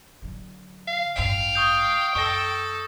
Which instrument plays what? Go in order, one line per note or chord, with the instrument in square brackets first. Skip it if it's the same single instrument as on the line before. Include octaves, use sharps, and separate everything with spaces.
[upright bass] D3 F#3
[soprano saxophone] F5
[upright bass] A1 G2 [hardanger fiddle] F5 [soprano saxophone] G5
[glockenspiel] C#6 D#6 G6
[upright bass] F#2 [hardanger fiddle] A4 [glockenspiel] C#6 A#6